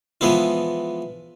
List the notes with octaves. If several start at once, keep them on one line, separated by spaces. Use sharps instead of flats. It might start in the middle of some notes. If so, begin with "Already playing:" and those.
E3 F3 G#3 B3 E4 F4